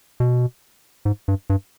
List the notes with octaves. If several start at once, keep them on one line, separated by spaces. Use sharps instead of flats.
B2
G#2
G2
G2